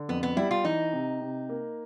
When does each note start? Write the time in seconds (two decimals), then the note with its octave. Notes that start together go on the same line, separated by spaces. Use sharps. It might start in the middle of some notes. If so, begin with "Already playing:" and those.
Already playing: D3
0.09 F2 B3
0.23 B3
0.37 G3 E4
0.51 F4
0.64 E3 D#4
0.93 C3
1.21 C3
1.49 A#3